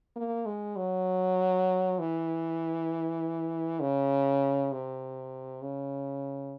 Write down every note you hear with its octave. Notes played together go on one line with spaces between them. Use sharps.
A#3
G#3
F#3
E3
C#3
C3
C#3